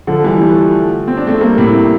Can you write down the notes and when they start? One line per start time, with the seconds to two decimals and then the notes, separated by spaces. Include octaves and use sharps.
0.07 D3 F3
0.24 E3 G3
0.41 F3 A3
1.08 C4
1.17 D4
1.27 A3 C4
1.41 G3 A#3
1.58 A2 C3